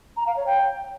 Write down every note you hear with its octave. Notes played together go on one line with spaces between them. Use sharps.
A#5
F5
C#5
G5